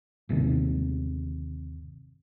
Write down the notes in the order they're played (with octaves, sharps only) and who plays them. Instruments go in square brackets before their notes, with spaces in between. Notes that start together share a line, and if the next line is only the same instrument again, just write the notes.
[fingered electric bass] G1 D#2 C3 D#3